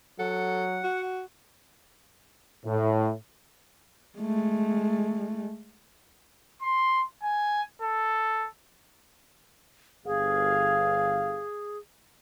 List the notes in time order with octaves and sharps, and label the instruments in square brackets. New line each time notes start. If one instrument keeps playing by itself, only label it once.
[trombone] F#3 [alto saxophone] A4 [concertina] F#5
[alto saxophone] F#4
[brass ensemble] A2
[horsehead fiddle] G#3 A3
[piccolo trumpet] C6
G#5
A4
[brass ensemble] G1 F5 [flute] G#4